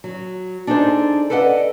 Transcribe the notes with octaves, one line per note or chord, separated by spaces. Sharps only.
F#3
D4 D#4 G#4 A4 C5
A4 B4 D5 D#5 F#5